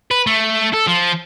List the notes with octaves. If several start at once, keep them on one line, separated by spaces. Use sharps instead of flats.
B4
A3
A4
F3